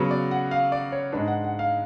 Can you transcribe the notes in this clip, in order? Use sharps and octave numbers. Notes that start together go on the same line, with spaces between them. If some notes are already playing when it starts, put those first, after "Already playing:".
Already playing: C#3 F#3 B3
D5
F#5
F5
D5
C#5
G#2 G#3 D4 B4
F#5
F#5
F5